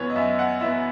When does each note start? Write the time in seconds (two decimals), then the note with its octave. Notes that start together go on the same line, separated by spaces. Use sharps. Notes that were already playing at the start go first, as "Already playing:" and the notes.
Already playing: F#2 E3 B3 B4 C#5
0.10 D#5
0.16 F#2 E5
0.39 F#5
0.61 E3 B3 E5